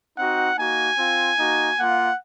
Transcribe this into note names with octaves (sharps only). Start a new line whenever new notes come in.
C4 D#4 F#4 F#5
A#3 D#4 F#4 G#5
C4 F4
A#3 D#4 F#4
A#3 F4 F#5